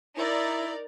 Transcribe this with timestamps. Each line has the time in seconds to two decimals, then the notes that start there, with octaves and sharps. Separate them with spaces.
0.16 D#4 E4 A#4 D5